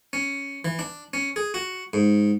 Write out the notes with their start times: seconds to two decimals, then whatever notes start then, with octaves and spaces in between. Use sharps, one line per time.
0.13 C#4
0.65 E3
0.79 D4
1.13 C#4
1.36 G#4
1.54 F#4
1.93 G#2